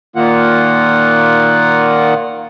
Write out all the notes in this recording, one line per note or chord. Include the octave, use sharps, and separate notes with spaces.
A#2 D#3 A#3 F4 F#5